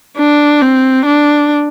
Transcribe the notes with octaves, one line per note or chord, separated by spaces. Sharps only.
D4
C4
D4